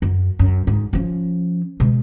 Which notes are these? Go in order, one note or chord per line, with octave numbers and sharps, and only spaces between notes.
F#2
F#2
G#2
F3 C#4
B2 G#3